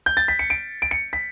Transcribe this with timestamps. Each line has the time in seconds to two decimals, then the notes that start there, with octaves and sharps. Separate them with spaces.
0.06 G6
0.17 A6
0.28 B6
0.39 C#7
0.50 D7
0.82 D7
0.91 C#7
1.13 B6